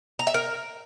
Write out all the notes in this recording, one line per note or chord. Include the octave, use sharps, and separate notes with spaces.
A#5
E5
A#4